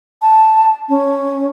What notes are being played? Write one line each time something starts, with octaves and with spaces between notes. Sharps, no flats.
A5
C#4